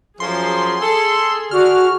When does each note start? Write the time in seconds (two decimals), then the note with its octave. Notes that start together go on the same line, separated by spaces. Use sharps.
0.20 F#2 F3 G#4 C6
0.81 A4
1.51 D3 F#4 F6